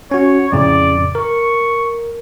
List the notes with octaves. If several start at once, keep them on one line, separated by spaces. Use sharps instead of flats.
C#4 F#4 C#5
F2 A2 C#3 D5
A#4 C#6